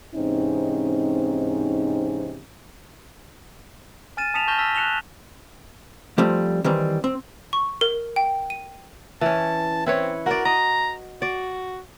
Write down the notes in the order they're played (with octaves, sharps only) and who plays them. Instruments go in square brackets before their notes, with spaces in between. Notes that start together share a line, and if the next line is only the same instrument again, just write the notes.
[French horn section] G#2 C3 E3 C4 C#4 D#4
[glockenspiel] G#5 F6 A6 D#7 E7
A5 D#6 B6 C#7 E7 F7
A5 C#6 F6 G6 A#6 G7
E6 F6 A#6 B6
F#6 C#7 E7 F7 G7
[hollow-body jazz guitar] F3 G3 A3 C4
D#3 E3 G3 C4
C4
[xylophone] C#6
A#4
G5
D#7
[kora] E3 C#4 [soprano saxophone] A5
[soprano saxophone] C4 [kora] E4 B4 C#5
[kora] F#4 D5 [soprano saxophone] A#4
[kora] D#5 [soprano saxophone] A#5
[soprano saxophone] F#4 [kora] D5